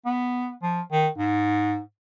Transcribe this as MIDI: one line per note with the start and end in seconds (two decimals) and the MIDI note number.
0.06 0.51 59
0.62 0.81 53
0.92 1.08 51
1.18 1.80 44